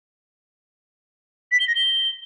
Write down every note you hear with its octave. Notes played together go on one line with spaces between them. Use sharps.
B6
G7
A#6
G7